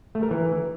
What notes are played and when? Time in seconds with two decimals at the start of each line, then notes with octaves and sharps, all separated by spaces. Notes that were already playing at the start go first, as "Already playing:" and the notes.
0.15 A3
0.23 A#4
0.31 E3